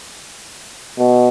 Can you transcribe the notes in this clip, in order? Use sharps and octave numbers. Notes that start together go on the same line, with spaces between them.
B2